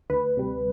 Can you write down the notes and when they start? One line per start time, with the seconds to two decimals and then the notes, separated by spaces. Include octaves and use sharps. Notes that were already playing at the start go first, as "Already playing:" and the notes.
0.10 D2 B4
0.37 C3 G3